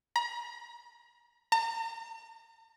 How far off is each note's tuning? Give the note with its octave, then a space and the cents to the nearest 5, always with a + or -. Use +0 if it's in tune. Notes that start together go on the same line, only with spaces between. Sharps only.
A#5 +40
A#5 -45